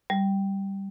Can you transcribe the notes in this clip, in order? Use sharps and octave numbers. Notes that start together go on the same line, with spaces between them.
G3